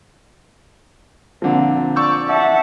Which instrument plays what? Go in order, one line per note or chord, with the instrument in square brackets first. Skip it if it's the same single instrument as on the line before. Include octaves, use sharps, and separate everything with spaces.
[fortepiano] A#2 D3 F3 [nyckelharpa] C4
[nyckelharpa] D5 [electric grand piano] C#6 E6 G6
[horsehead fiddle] E5 F#5 [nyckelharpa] A5